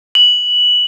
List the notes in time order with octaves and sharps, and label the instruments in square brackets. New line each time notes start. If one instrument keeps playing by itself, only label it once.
[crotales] F#7